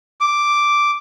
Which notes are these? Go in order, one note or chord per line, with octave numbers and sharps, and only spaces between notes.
D6